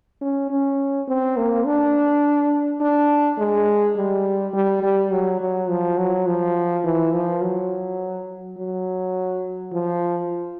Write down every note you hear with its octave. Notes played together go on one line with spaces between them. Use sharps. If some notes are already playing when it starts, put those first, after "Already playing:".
C#4
C#4
C4
A#3
D4
D4
G#3
G3
G3
G3
F#3
F#3
F3
F#3
F3
E3
F3
F#3
F#3
F3